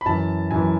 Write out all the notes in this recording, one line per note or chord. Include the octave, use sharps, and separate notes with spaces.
B5
F#2 E3 A5
F#2 E3 G#5